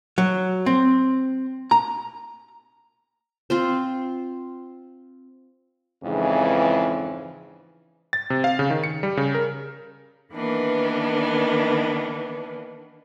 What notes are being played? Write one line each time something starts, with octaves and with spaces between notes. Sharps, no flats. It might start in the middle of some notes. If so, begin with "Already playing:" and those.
F#3
C4
A#5
C4 F4 C5
F2 G#2 C#3 E3
A6
C3
F5
C#3
D#3
C#7
G3
C#3
A#4
D#3 E3 A#3 B3 D4